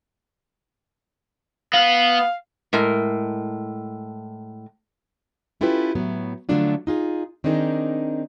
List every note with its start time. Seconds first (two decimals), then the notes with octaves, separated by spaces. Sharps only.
1.73 B3 F5
2.73 A2 G#3 A#4
5.61 C#4 E4 F4 G4 A4 B4
5.95 A2 F#3 B3
6.49 D3 F3 F#3 A3 D4 F4
6.87 D#4 F4 G#4
7.44 D#3 C4 D4 D#4 G#4 A#4